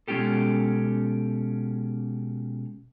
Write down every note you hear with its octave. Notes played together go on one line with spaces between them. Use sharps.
B2 G#3 C#4 F4 G4 A4